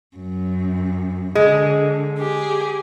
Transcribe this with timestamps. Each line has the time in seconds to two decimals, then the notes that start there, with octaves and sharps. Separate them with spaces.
0.17 F#2
1.35 D3 G#3
2.19 G4 G#4